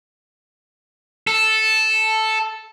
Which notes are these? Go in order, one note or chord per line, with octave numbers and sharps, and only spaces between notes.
A4